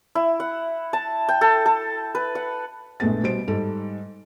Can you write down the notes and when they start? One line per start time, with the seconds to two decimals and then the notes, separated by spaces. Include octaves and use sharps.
0.15 E4
0.40 F#5
0.93 A5
1.29 G5
1.41 A4
1.66 A4
2.15 B4
2.35 F#5
3.00 A#1 A2 G#3 A3 B3 A6
3.23 B2 G3 B3 C5 D7
3.48 G#2 G3 A4